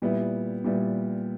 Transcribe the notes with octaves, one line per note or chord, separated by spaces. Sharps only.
A#2 G3 B3 E4
A#2 G3 B3 E4